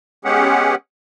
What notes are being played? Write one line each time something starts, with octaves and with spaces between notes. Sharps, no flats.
G#3 B3 C#4 G4 G#4 F#5